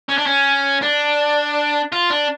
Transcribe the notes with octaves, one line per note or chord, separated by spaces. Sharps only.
C#4
D4
C#4
D4
F4
D4